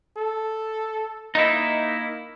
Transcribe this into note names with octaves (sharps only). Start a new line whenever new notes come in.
A4
A#3 D#4 E4